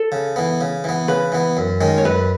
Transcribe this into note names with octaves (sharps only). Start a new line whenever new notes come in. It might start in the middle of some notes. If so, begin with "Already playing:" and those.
Already playing: A4
C#3
E3 B3
C#3
E3 B3
C#3 B4
E3 B3
F#2
D#3 G#3 C#4
C#5
F#2 B4